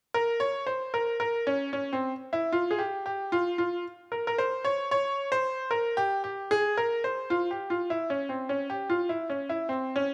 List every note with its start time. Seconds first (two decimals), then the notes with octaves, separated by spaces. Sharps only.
0.14 A#4
0.40 C#5
0.67 C5
0.94 A#4
1.20 A#4
1.47 C#4
1.73 C#4
1.93 C4
2.33 E4
2.53 F4
2.71 G#4
2.79 G4
3.06 G4
3.32 F4
3.58 F4
4.12 A#4
4.27 A#4
4.38 C5
4.65 C#5
4.91 C#5
5.32 C5
5.71 A#4
5.97 G4
6.24 G4
6.51 G#4
6.77 A#4
7.04 C5
7.30 F4
7.51 G4
7.70 F4
7.90 E4
8.10 C#4
8.29 C4
8.49 C#4
8.70 G4
8.90 F4
9.09 E4
9.30 C#4
9.49 E4
9.69 C4
9.96 C#4